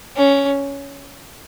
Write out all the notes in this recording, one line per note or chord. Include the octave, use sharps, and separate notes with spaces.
C#4